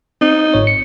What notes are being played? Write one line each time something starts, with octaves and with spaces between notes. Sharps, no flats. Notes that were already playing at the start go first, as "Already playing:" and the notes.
C4 D#4
G1 G#2 C#5
C#7